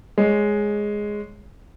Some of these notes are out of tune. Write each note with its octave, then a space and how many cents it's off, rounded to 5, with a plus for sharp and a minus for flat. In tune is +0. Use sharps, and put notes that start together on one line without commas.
G#3 +0 C#5 +0